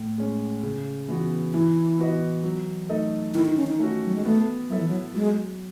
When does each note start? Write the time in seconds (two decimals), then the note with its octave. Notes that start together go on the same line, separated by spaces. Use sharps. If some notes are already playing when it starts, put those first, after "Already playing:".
Already playing: A2
0.18 G#3 C#4
0.63 C#3
1.08 E3 B3 F#4
1.54 E3 E4
1.98 B3 F#4 B4 D#5
2.43 F#3
2.89 A3 D#4 A4 D#5
3.34 D#3 E4
3.46 D#4
3.57 C#4
3.67 D#4
3.79 A3 C#4 F#4
4.05 F#3
4.14 G#3
4.25 A3 B3
4.70 F#3 E4 A4 E5
4.79 E3
4.88 F#3
5.14 F#3 G#3